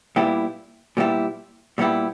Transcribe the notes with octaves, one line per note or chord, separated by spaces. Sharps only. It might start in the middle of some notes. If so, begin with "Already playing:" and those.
A#2 G3 B3 E4 G4
A#2 G3 B3 E4 G4
A#2 G3 B3 E4 G4